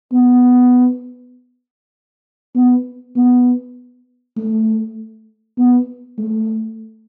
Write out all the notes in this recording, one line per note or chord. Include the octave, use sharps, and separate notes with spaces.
B3
B3
B3
A3
B3
A3